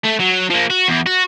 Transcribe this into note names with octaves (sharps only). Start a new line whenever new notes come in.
A3
F#3
F3 A#3
F#4
E2
F#4